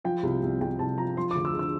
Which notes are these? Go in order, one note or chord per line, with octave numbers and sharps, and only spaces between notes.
F3 G5
C2
C2
C2 G5
C2 A5
F3 A#5
F3 C6
D6
D2
E6
D3
E6